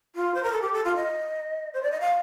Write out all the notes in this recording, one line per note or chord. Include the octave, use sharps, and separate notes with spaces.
F4
C5
A#4
A4
G4
A4
F4
D#5
C5
D5
D#5
F5